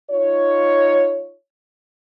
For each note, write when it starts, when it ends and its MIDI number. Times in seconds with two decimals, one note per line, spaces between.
0.11 1.35 63
0.11 1.35 65
0.11 1.35 73